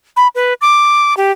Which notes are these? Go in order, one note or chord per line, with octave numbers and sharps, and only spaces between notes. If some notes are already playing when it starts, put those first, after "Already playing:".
B5
B4
D6
G4